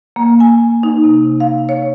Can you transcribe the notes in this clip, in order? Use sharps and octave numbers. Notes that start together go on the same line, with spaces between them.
A#3
G#5
D#4
C3
F5
C#5